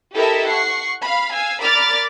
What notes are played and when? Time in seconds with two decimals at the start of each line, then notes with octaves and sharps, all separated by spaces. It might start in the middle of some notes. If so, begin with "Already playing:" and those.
0.14 E4 G4 A4 A#4 D#5 E5
0.47 F#5 C#6 C7
1.02 F5 B5
1.32 F5 G#5 E6
1.60 A#4 D5 B5 D6 F6 A6